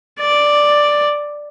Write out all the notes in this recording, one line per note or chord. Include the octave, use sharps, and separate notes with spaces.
D5